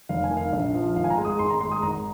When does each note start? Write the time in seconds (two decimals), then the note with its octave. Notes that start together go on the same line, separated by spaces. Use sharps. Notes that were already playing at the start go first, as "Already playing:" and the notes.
0.09 F1 F5
0.24 G#5
0.31 D#3
0.37 F5
0.53 A#1
0.75 F3
0.96 G#1 F5
1.04 G#5
1.10 A#5
1.18 G#3
1.25 D#6
1.39 G#1 C6
1.50 A#5
1.60 G#3 C6
1.72 D#6
1.82 G#1 A#5